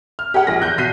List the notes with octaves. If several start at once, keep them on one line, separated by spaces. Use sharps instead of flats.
F6
G4 G#4 F#5
A#1 G#4 A#6
E2 F#6 G6
B2 B6 C7 D#7